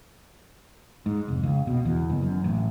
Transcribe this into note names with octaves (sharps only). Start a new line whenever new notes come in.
G#2
F1
C#2
B2
E2
F#1
F#2
A1